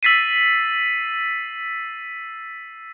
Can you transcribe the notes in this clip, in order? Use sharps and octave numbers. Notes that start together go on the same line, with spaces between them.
E6 A6 B6 C7 D#7